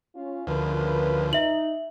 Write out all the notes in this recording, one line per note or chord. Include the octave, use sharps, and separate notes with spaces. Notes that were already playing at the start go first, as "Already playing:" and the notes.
C#4 F4
D2 C#3 F3 A#4 B4
D#4 E5 F#7